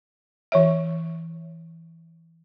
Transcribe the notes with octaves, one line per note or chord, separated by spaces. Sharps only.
E3 C#5 E5